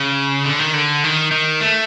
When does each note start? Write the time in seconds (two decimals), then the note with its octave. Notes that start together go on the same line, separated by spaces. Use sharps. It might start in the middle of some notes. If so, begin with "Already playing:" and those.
Already playing: C#3
0.45 D3
0.59 D#3
0.74 D3
1.04 D#3
1.32 D#3
1.61 A3